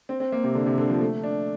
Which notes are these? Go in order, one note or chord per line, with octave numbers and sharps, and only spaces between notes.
C4
C4
A#3
C3
D3
C3
D3
F3
A3
D4